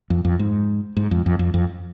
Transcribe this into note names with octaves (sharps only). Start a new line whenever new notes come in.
F2
F2
G#2
G#2
F2
F2
F2
F2